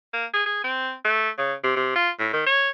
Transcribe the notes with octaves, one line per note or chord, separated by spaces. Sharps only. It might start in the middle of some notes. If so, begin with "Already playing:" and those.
A#3
G#4
G#4
C4
A3
C#3
C3
C3
F4
A2
D#3
C#5